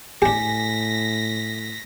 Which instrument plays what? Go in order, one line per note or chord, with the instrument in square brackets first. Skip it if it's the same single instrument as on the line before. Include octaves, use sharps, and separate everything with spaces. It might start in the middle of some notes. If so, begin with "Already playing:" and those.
[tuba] A2 [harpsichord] D4 G4 [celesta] G#5 [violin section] A#6 B6